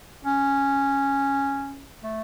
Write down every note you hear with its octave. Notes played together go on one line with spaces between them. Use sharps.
C#4
A3